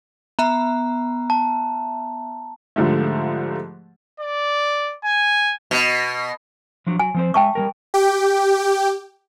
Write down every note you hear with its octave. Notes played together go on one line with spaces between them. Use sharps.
B3 E5 A#5
A5
G#2 D3 F3 G3 A3
D5
G#5
B2
F3 F#3 D4
F#3 G#5
F3 C4 C5
G#3 E5 G5 A5 C#6
G3 G#3 A#4
G4 G5